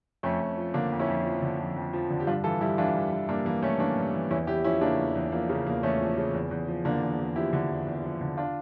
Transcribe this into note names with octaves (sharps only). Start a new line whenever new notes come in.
F2 A3 C#4
F2
F3
D3 A#3 D4
F2
C#4 E4
F2
F3
D3
F2
F2
F3
D3
G4
G2 D4 F4
E3 F4 A4
G2 E4 G4
E3 D4 F4
G2
E3
G2 A#3 D4
E3 A#3
G2 A3 C#4
E3 A#3 D4
G2
E3
E2 C#4 E4
E2 E4 G4
F3 C#4 E4
C#3 A#3 D4
E2
E2
F3 A#3
C#3 A#3
E2 A#3
E2 A3 C#4
F3
C#3
E2
E2
F3
D3 A#3 D4
E2
E2
F3 E4 G4
D3
E2
E2
F3
D3
D4 F4